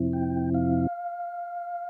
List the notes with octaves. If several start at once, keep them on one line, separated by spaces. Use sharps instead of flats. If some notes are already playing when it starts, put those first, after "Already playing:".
Already playing: F2 C3 F3 C4 E4
G5
F5